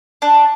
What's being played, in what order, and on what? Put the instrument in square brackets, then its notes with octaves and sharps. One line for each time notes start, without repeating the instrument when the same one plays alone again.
[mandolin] D4